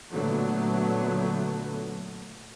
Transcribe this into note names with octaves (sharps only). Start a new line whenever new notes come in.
A#2 D3 F#3 A3 B3